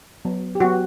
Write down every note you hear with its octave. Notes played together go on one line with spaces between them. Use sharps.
F#3 B3
G4
F#3 B3 F#4